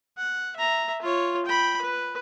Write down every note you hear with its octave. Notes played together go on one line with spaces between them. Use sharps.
F#5
E5 A#5
F4 C#5
G5 B5
B4